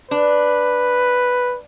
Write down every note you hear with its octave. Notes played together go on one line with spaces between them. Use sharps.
D4 B4